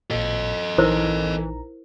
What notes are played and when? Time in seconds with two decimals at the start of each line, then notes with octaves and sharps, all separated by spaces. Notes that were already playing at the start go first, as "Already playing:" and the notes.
0.11 A1 A#2 A4 D#5
0.78 A#1 E3 D#4 E4 A#4 C5 A#5